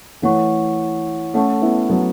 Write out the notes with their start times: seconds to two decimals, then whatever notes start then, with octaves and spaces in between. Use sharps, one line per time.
0.22 E3 A3 C#5 F#5 C#6
1.34 A3 C#4 A4 F#5 A5 C#6
1.62 B3 E4
1.90 F#3 B3